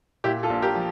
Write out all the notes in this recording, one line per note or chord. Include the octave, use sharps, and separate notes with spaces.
A#2 E4 G4
F4 A4
A#1
G4 A#4
F3